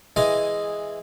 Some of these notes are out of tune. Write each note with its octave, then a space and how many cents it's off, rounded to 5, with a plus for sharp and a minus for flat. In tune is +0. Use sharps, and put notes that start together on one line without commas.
E3 +0 G#3 +0 D#5 +0